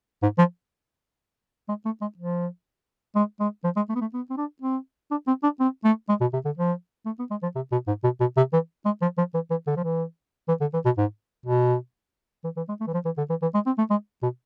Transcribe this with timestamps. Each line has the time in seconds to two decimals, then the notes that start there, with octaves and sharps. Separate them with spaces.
0.23 G#2
0.39 F3
1.69 G#3
1.86 A3
2.02 G#3
2.18 F3
3.16 G#3
3.40 G#3
3.64 F3
3.77 G#3
3.89 A3
3.95 B3
4.01 A3
4.14 B3
4.30 C4
4.38 D4
4.62 C4
5.11 D4
5.28 C4
5.44 D4
5.60 C4
5.84 A3
6.09 G#3
6.21 B2
6.34 C3
6.45 D3
6.58 F3
7.06 A3
7.19 B3
7.31 G#3
7.43 F3
7.56 C3
7.72 B2
7.88 G#2
8.04 B2
8.21 B2
8.37 C3
8.53 E3
8.86 G#3
9.02 F3
9.18 F3
9.34 E3
9.50 E3
9.67 D3
9.77 F3
9.84 E3
10.48 E3
10.61 D3
10.74 E3
10.85 B2
10.98 G#2
11.46 B2
12.44 E3
12.57 E3
12.69 G#3
12.81 A3
12.88 E3
12.94 F3
13.05 E3
13.18 D3
13.30 E3
13.42 E3
13.54 G#3
13.66 C4
13.78 A3
13.91 G#3
14.23 B2